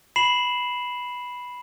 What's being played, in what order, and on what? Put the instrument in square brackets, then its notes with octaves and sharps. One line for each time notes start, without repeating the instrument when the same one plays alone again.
[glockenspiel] B5 C7 E7 F#7